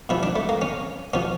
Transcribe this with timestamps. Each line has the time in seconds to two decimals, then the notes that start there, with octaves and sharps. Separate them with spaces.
0.09 A#2 F3 E4
0.23 D4
0.36 A3
0.49 A#3
0.62 C#4
1.14 A#2 F3 C#4